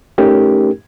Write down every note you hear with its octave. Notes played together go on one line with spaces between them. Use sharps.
A3 C#4 D#4 G4 A#4